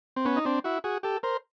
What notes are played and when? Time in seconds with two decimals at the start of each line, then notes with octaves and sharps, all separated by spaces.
0.16 C4
0.25 B3 C#4
0.36 D#4
0.45 C4 D4
0.64 E4 F#4
0.84 F#4 G#4
1.03 G4 A4
1.23 A#4 C5